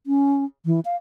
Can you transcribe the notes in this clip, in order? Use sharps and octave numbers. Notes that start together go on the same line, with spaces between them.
C#4
E3
F5